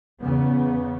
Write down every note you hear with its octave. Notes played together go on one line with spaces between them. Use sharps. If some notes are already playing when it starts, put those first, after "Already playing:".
E2 C#3 B3